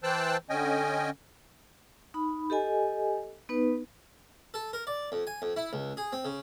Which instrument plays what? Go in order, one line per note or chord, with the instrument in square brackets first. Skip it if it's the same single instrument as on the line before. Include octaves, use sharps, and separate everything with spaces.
[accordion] E3 C5 G5 A5 E6 F#6
D3 C#4 D#5 G5 G#5
[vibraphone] D#4 B5
G4 A4 D#5 G#5
B3 D#4 B4
[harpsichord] A4
A#4
D5
F2
G#5
F2
E4
C#2
G#4
C4
C#3